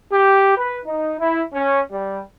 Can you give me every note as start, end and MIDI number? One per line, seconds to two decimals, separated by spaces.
0.11 0.57 67
0.57 0.78 71
0.86 1.13 63
1.19 1.41 64
1.54 1.81 61
1.91 2.20 55